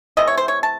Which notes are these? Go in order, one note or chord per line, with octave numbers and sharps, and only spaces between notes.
C3 E3 A3 D#5
C#5
C5
C#5
A5